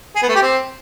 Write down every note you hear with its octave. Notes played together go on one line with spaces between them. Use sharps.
G#4
B3
A3
G4
C4